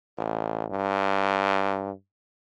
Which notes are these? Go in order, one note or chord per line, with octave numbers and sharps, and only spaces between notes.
A1
G2